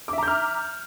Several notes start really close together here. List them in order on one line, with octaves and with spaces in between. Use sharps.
D6 E5 A#5 G6 F6